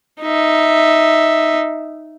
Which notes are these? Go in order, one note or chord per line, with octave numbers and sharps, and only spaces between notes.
D#4 E5